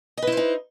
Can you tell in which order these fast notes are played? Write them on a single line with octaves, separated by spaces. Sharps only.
D#5 B4 E4 C5 D#4